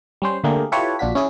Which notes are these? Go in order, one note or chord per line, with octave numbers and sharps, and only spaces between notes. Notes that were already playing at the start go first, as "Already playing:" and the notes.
G3 C#4 C5
D3 A3 A#3 G4 G#4 A#4
E4 F4 G4 A4 B4 C#5
A#1 D4 F4 F#4 B6
C#4 E4 G#4